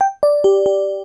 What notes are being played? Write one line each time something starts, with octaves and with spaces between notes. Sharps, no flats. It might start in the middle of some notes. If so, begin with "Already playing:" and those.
G5
D5
G4
G4